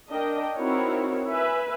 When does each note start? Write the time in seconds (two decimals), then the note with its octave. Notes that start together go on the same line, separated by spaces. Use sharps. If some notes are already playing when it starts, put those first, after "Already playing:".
0.10 D4 A#4 D#5 G5
0.58 C4 D#4 E4 F#4 A#4 C#5
1.30 B4 E5 G#5